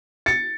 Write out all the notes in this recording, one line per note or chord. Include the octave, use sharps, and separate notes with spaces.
A6 C#7